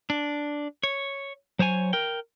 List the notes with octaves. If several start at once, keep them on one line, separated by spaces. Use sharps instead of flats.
D4
C#5
F#3 C5 C#5 G#5
A#4 G5